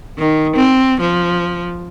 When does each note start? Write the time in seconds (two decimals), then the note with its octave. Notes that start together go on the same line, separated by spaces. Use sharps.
0.18 D#3
0.56 C4
1.01 F3